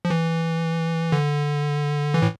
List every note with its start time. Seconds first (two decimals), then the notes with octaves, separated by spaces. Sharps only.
0.05 F3
0.10 E3
1.12 D3
2.14 E3
2.22 A2